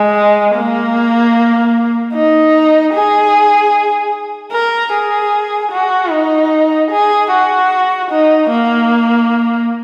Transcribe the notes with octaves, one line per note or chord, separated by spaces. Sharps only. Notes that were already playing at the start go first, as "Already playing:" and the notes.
Already playing: G#3
A#3
D#4
G#4
A#4
G#4
F#4
D#4
G#4
F#4
D#4
A#3